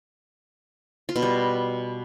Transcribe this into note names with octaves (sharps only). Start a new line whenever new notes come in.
F4
B2
G3